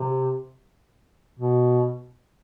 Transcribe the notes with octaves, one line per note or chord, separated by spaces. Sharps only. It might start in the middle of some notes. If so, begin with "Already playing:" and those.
Already playing: C3
B2